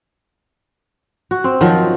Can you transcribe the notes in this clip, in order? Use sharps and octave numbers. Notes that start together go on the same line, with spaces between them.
F#4
C4
D#3 F3 F#3